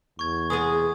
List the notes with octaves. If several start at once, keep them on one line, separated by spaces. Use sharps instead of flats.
E2 C#6 G#6
G#3 B3 G#4 G#5 D#6